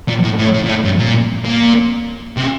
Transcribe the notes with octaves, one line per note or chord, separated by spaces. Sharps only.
A#2
A2
A2
A2
A#2
A2
G2
A#2
A#2
C3